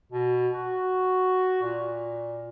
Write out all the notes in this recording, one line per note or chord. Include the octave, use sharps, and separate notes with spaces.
B2
F#4
A#2